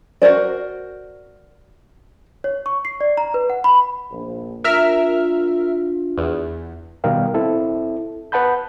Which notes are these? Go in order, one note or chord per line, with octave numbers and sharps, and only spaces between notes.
F#4 A#4 C5 D5
C#5
C#6
C7
D5
A#5
B4
F#5
B5
A#1
D4 F4 A#4 E5 F6
E2
B2 D#3 G3 A#4 F5 G5
C4 E4 A4
B4 F#5 A5 B5 G6